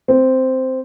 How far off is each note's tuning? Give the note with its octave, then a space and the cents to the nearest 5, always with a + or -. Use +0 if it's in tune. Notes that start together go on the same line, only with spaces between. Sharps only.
C4 -5